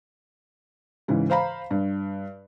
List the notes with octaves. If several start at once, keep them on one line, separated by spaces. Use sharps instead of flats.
G#2 C#3 E3
C5 F5 A#5 B5
G2